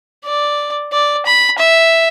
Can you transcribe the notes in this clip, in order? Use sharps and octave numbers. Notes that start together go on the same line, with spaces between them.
D5
D5
B5
E5